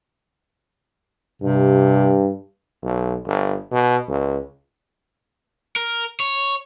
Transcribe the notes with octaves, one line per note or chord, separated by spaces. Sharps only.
G2 C3
B1
G1
B2
C#2
A#4
C#5